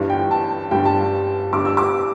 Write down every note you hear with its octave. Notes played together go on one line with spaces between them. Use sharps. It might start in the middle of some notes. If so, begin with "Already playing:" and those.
Already playing: G1 G2 E3 G3
G5
A5
G1 G2 G3 G5
A5
G1 G2 G3 D6
E6
D6